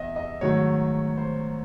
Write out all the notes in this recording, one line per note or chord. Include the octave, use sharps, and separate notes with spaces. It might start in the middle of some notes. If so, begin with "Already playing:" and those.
Already playing: E2 D#5 E5
D#5
G#2 D#3 F#3 A3 C#5
C5